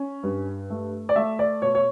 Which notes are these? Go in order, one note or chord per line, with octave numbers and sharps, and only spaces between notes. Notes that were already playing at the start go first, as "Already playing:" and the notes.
Already playing: C#4
G2
A3
D5
A3 E5
D5
B2 C#5
C#5